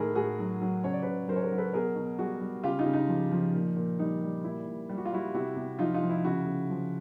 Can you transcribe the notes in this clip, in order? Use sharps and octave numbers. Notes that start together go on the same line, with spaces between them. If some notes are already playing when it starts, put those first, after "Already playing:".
Already playing: A2 D#3 G#4 A#4
A2 F#4 G#4
F#3
F#3
C#3 C#5
D5
C#3 B4 C#5
F#3 A#4 C5
C#5
A#4 C5
F#3
A4 B4
B2 G#4 A#4
B2
G3 F#4 G#4
G3
C#3 F4 G4
D#4 F4
C#3
D#4
F3
F3
A#2
A#2
G3 D#4
G3
A#2 E4
A#2
G3 G4
F#4
F4
G3 E4 F#4
C3 E4 F#4
C3
F3 D#4 F4
D#4 F4
F3
E4
C#3 E4 F#4
C#3
F3